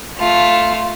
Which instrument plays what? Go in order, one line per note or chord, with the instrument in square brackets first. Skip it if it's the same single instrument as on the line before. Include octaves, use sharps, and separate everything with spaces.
[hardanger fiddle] A3 F4